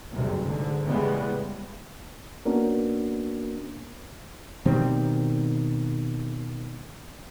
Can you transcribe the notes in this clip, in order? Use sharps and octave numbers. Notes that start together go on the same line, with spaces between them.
F#1 D2 G2 C3
A1 G#2 D3
A2 C#3 E3 G3 G#3 B3
A#3 B3 C#4 D4 F#4 A#4
B2 D#3 G3 C4